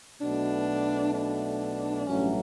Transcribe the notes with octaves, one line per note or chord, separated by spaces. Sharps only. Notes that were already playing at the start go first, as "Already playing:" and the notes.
B1 B2 A3 D4
D4
A1 G2 F#3 A3 C#4